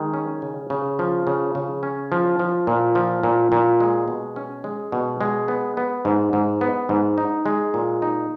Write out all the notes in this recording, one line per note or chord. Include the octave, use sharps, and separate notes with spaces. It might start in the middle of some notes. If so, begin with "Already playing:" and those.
Already playing: D#3 G#3
C#4
C#3
C#3
F3
C#3
C#3
C#4
F3
F3
A#2
F3
A#2
A#2
G#3
B2
C#4
G#3
B2
G#3
B3
B3
G#2
G#2
B3
G#2
D#4
G#3
A#2
D#4